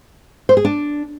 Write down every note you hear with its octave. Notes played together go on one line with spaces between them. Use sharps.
C5
G#4
D4